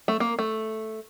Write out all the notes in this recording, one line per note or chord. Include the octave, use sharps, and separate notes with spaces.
A3
A#3
A3